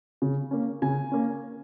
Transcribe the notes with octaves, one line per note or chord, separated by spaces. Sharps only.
C#3
A#3 C#4
C#3 G#5
A#3 C#4